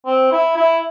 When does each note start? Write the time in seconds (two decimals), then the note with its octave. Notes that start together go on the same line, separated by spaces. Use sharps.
0.06 C4
0.32 E4
0.56 E4